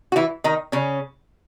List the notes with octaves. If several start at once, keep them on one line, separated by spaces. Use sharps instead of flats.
F#4
E3 E4
D#3 D#4
C#3 C#4